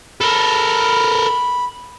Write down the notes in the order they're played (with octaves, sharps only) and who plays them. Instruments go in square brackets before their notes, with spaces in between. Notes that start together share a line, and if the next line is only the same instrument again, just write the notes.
[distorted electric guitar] A4 A#4 [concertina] B5